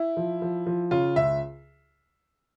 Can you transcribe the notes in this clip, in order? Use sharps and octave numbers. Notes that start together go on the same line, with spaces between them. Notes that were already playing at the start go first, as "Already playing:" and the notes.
Already playing: E4
F3
F3
F3
C#3 F4
C#2 E5